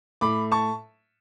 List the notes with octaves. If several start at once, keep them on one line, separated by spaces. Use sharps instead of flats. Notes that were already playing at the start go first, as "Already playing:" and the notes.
A2 B5 D6
A5 C#6